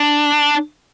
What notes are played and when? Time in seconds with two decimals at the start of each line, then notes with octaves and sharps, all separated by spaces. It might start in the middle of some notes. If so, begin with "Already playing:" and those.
Already playing: D4